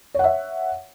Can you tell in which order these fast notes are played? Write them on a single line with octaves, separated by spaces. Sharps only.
C#5 F#5 E5